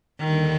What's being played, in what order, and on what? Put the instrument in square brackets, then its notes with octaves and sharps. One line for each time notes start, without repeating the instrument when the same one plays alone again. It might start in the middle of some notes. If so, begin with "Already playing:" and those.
[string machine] D#2 D3 G3 D4 A4 [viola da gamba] D#3